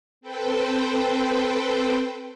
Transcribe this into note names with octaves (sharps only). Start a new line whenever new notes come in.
C4 A4 B4 C5 G5